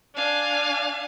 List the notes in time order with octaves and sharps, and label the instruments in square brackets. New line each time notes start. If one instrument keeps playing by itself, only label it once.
[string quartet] D4 F5 G#5